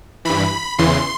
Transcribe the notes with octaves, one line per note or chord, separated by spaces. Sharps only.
G2 E3 B5
E2 C#3 E3 C6